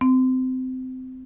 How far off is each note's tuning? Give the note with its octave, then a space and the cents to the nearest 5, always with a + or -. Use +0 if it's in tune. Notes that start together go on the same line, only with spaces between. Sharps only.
C4 -25